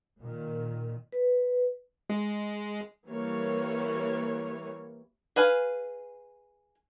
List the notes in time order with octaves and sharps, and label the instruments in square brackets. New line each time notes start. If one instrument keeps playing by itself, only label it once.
[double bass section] A#2 D#3
[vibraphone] B4
[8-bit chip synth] G#3
[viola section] E3 G3 A#3 C#5
[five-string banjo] G#4 B4 F5 G#5